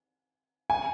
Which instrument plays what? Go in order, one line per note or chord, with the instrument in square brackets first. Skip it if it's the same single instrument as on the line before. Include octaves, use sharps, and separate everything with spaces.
[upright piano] G#5